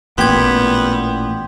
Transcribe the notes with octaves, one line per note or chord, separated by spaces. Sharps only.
A1 A#2 B3 G4 C6 G#6